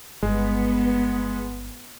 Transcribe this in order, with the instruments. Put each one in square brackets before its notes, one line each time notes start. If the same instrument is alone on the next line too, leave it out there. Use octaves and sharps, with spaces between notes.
[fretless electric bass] G1 [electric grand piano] G#3 [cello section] B3